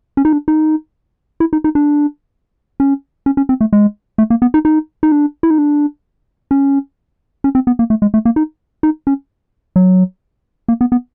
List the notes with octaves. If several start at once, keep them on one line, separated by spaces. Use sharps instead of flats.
C#4
D#4
D4
D#4
E4
D#4
D#4
D4
C#4
C#4
C#4
C4
A3
G#3
A3
A#3
B3
D#4
D#4
D#4
D4
E4
D#4
D4
C#4
C#4
C4
B3
A#3
A3
G#3
A3
A#3
D#4
D#4
C#4
F#3
A#3
B3
B3